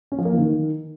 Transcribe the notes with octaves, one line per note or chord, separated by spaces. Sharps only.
C#4
F3
A#3
E3
D#3